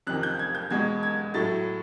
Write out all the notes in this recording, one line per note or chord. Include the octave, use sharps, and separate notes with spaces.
F2 C3 D#3 F#6
G6
G#6
G6
E2 B2 G#3 G#6
G#6
A2 F#3 A3 A6